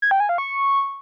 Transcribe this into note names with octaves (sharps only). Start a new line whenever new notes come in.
G#6
G5
G#5
F5
C#6